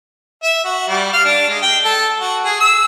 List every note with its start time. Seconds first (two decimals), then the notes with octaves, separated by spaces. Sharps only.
0.44 E5
0.65 F#4
0.88 G3
1.13 F5
1.25 D4
1.49 G#3
1.62 G5
1.85 A4
2.20 F#4
2.45 G#4
2.60 E6